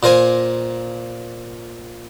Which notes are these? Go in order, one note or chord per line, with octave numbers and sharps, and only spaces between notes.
A#2 A#4 C5 G#5